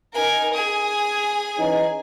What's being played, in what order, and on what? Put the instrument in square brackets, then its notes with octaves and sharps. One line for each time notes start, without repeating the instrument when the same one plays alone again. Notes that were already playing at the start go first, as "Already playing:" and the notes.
[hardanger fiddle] D#4 A#4 [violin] G#5
[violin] G#4 G#5 [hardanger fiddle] D#6
[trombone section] E3 C#4 D#4